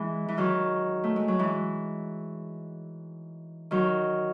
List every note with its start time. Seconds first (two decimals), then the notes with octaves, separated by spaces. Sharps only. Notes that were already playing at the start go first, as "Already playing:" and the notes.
Already playing: E3 G#3
0.28 E3
0.37 D#3 F#3
1.04 A3
1.16 G#3
1.28 F#3
1.39 E3 G#3
3.71 D#3 F#3